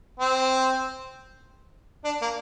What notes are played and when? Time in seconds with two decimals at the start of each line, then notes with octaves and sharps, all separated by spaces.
0.20 C4
2.04 D4
2.22 A#3